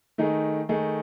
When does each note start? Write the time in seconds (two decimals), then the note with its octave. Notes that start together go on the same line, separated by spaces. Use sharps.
0.18 D#3 A3 D#4 G#4
0.69 D#3 A3 D#4 G#4